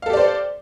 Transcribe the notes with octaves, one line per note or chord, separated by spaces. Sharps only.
G4 A4 C5 D5 F5